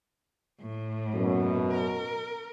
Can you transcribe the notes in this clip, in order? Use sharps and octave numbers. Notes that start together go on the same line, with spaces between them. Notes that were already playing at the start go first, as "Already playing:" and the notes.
A2
F#2 B2
A#4